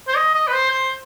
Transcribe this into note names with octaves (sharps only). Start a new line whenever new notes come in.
C5
D#5
D#5
B4
C5
C5